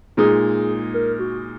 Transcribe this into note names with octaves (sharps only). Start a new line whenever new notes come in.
A#2 G#3 D#4 G#4
A#4
F#4